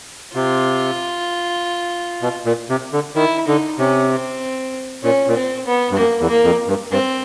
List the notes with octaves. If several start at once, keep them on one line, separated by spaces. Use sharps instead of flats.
C3 F4
B2
A#2
C3
D3
D#3 E4
D3 D#4
C3 C#4
C4
A#2 C#4
A#2
C4
B3
G2
F#2 A#3
E2
A#3
F2
G2
G2 C4